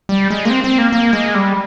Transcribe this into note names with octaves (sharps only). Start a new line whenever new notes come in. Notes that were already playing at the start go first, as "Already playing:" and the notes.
G3
G#3
A#3
C4
C4
A#3
A#3
G#3
G3